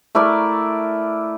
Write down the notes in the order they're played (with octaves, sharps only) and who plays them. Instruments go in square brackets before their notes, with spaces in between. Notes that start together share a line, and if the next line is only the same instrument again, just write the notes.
[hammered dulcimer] A3 E4 A#4 D5